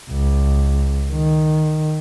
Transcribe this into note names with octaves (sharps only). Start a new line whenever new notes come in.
C#2
D#3